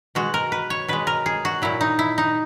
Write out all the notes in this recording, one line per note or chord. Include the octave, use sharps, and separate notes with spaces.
B2 G#3 F#4
A#4
B4
C#5
B2 G#3 B4
A#4
G#4
F#4
A#2 F#3 E4
D#4
E4
D#4